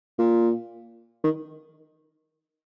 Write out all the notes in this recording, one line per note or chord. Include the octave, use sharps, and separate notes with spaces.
A#2
D#3